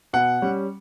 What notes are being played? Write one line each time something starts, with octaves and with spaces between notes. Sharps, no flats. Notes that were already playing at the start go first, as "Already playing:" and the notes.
B2 F#5
G3 C#4